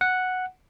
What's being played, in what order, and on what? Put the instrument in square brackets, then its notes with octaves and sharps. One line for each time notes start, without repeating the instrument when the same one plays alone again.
[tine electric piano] F#5